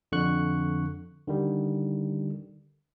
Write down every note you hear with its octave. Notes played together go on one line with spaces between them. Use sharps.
F2 D3 C#6 F#6
D3 D#3 G3